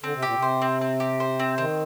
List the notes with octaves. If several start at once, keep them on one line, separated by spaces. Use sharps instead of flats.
D3 C4
C3
A#2 G4
C3
C5
C4
C4
G4
C5
C4
D#3 C4